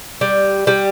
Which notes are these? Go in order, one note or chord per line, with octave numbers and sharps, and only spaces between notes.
G3
G3